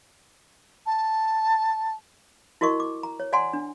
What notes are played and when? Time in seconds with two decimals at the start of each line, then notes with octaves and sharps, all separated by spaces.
0.86 A5
2.61 E4 F#4 A#4 D#5 C#6
2.80 D6
3.03 A#5
3.20 C#5
3.33 D5 F#5 G#5 A#5 C6
3.53 D4